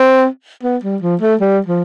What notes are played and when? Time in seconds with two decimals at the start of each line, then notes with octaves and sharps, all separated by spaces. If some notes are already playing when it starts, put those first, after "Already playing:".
Already playing: C4
0.63 B3
0.84 G3
1.02 F3
1.21 A3
1.41 G3
1.66 F3